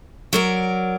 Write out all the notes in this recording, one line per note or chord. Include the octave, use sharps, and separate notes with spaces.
F#3 A#4 D5